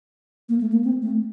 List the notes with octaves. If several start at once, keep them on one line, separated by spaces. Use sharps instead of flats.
A#3
A3
A#3
C4
A3